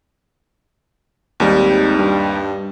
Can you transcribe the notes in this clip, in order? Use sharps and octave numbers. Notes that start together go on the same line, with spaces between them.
G#1 D#2 G3 D#4
G2